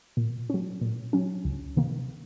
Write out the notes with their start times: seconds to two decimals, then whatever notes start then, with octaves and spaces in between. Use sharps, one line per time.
0.17 A#2
0.50 F#3 C#4
0.81 A#2
1.13 F#3 C#4
1.45 C#2
1.77 C3 D#3 A#3